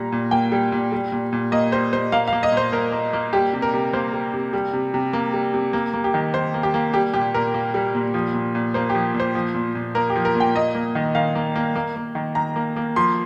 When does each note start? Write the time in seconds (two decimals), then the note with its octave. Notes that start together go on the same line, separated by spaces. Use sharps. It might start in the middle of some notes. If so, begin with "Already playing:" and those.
Already playing: A#2 G3 A#5
0.12 A#2
0.31 A#3 G5
0.52 G3
0.72 A#2
0.92 G3
1.12 A#2
1.33 A#2
1.52 A#3 D#5
1.72 G3 C5
1.93 A#2 C5
2.12 A#3 F5
2.28 F5
2.33 A#3
2.43 D#5
2.52 A#2 C5
2.72 A#2 A#4
2.92 A#3
3.13 A#3
3.33 G3 G4
3.53 C3
3.62 A#4
3.73 C3
3.93 A#3 C5
4.13 G3
4.34 C3
4.53 G3
4.73 C3
4.94 C3
5.13 A#3
5.33 G3
5.54 C3
5.73 A#3
5.94 A#3
6.04 G4
6.14 D#3
6.34 D#3 C5
6.54 A#3
6.63 G4
6.74 A#3
6.93 G3 G4
7.14 A#2 G4
7.34 A#2 A#4
7.54 A#3
7.74 G3
7.95 A#2
8.14 F3
8.34 A#2
8.55 A#2
8.74 A#3 C5
8.90 G4
8.95 F3
9.14 A#2
9.20 C5
9.35 F3
9.54 A#2
9.75 A#2
9.95 A#3 A#4
10.10 G4
10.16 F3
10.25 A#4
10.35 A#2
10.40 G5
10.55 A#3 D#5
10.75 A#3
10.95 D#3
11.15 D#3 F5
11.35 A#3
11.56 A#3
11.76 A#3
11.96 A#3
12.15 D#3
12.35 D#3 A#5
12.56 A#3
12.76 A#3
12.96 F3 C6